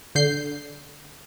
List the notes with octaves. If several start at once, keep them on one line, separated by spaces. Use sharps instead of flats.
D3 G6 C7